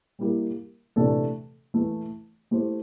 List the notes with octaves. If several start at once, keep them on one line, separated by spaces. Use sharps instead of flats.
G3 A#3 E4 G4 A#4
C3 E3 A3 D4 A4
E3 A3 E4
A3 E4 G4 C5